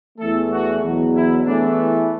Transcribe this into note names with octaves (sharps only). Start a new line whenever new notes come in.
E2 E3 A3 A4
F#4
E2 B2 F#3
E4
E2 E3 A3 D4